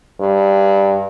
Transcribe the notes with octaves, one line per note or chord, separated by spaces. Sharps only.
G2